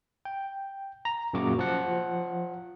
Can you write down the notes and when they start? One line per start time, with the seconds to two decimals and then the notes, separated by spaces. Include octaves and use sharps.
0.25 G5
1.05 A#5
1.34 F#2 A#2 C#3 F#4 D6
1.59 F3 F#5